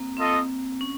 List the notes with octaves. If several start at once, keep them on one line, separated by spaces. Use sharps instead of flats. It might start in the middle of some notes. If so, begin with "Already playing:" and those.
Already playing: A#3 C4
C4 F4 A4 D#5
C#4